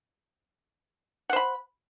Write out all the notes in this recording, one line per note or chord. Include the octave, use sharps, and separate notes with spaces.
C5 F#5 B5